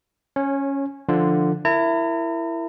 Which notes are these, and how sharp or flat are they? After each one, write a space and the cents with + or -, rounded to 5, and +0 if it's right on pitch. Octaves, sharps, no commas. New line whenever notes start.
C#4 +0 C#5 -25
D3 +10 F3 +0 F4 -15
E4 +15 A#4 -15 A#5 -40